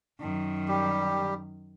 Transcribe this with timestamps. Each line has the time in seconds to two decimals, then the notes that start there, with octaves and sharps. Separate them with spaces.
0.20 F#2 D#3
0.68 G3 G4